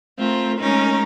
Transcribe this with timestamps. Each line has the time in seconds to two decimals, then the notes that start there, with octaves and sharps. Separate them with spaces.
0.18 A3 C4 F4 A#4
0.59 G#3 A3 C#4 D#4 A#4